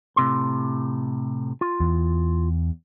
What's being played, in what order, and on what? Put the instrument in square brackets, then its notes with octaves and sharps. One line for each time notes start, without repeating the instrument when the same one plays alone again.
[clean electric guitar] A2 C3 C6
F4
[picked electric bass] E2